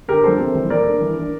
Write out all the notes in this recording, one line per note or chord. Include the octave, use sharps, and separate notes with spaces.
D3 G4 A#4
F3 A#3 D4 A4 C5
C3
E3 G3
A#2 A#4 D5
A3 D4
E3
A#3 D4